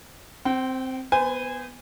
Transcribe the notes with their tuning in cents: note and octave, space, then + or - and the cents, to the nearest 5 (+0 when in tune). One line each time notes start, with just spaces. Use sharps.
C4 +0 G5 -35
B3 +0 C5 -30 G#5 -20